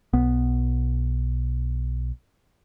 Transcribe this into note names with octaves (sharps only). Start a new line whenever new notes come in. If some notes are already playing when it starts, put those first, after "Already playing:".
B1 B3